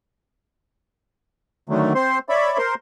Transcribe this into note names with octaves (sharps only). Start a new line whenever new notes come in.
D3 D#3 F#3 A3
C4 C5 C6
C#5 D5 E5 B5
A#4 C5 C6